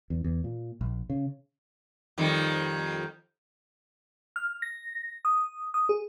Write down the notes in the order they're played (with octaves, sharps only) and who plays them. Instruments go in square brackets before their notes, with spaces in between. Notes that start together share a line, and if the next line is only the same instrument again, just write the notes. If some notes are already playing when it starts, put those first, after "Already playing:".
[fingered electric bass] E2
E2
A#2
A#1
C#3
[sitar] F2 D#3 G3
[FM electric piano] F6
A#6
D#6
D#6
G#4